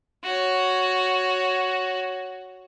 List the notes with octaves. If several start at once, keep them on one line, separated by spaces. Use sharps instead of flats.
F#4 C#5